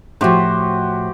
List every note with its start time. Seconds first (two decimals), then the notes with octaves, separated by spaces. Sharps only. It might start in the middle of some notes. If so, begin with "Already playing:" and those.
0.21 A2 F3 F#4 G4 C5